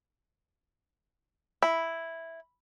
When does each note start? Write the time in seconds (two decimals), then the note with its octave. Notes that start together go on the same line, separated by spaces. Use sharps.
1.63 E4